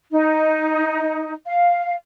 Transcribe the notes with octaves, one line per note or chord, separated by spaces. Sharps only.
D#4
F5